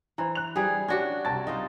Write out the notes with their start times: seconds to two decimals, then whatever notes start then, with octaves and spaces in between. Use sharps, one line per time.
0.18 E3 C5 A#5
0.35 F#6 F7
0.56 E3 G3 G#4 G5
0.88 C#4 D4 F#4 G4 G#6
1.25 C2 C4 A5 A6
1.47 D#4 F4 C5